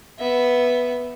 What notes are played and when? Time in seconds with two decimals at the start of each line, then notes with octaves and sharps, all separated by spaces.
0.19 B3 E5